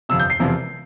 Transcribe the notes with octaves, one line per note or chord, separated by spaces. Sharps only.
G1 F2 C3 E6
G6
C7
E1 E2 C3 F3 C4